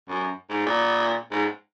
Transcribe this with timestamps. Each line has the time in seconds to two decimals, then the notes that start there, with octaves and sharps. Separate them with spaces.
0.09 F#2
0.50 G#2
0.66 A#2
1.32 G#2